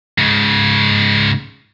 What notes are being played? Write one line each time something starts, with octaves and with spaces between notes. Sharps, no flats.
G#2 C#3